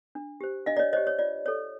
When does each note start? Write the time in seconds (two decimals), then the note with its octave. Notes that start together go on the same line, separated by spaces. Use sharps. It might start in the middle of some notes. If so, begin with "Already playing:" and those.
0.15 D4
0.41 G4 C5
0.66 D4 D#5 F5
0.77 D5
0.79 C#5 D#5
0.93 G4 C5 C#5 D#5
1.07 C#5
1.19 F4 D5
1.46 A4 C#5